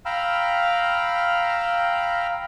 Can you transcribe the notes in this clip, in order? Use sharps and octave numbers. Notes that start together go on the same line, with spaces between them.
F5 G5 A#5 B5 E6 F6